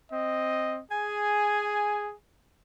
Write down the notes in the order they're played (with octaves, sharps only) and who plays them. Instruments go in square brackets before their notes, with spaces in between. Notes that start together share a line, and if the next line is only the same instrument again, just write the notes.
[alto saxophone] C4 [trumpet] D#5
[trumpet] G#4 [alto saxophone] G#5